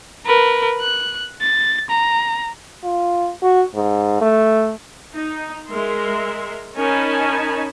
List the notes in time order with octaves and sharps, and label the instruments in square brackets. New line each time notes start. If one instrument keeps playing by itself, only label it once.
[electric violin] A#4 B4
F#6
A6
A#5
[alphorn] F4
F#4
G#2
A3
[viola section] D#4
G#3 A#4 E5 C6
C#4 D#4 A#4 G#5 A5 B5